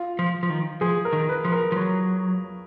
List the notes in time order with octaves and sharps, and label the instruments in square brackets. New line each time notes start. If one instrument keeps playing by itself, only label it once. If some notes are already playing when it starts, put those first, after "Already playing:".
Already playing: [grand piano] F4
[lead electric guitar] F3
F3
D#3
[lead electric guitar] F3 [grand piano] G#4
[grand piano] A#4
[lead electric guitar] D#3
[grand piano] B4
[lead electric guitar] F3
[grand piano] A#4
[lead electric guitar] F3
F#3